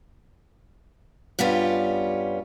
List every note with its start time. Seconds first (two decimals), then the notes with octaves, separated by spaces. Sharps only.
1.39 G2 G3 B3 C#4 F4